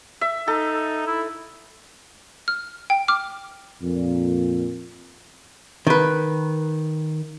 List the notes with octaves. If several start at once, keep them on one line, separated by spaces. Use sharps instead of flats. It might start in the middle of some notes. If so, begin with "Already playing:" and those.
E5
D#4 A4
E4
F6
G5
D6 F6
F2 A#2
D#3 B4